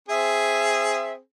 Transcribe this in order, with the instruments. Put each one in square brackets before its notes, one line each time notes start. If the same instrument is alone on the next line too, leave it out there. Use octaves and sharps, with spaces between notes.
[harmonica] C4 G#4 [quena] E5